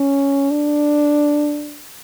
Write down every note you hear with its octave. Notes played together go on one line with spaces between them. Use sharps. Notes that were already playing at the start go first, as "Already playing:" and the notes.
Already playing: C#4
D4